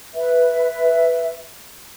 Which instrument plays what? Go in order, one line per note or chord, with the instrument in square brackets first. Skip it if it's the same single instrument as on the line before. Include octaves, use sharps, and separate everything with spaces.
[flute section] B4 E5